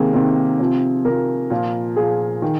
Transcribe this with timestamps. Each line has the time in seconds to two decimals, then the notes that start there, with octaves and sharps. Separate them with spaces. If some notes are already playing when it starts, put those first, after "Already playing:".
Already playing: C3 D#3 A#3 G#4
0.14 C3 D#3
0.60 C3 F3
1.05 C3 F3 A#4
1.50 A#2 F3
1.96 A#2 F3 G#4
2.42 D#3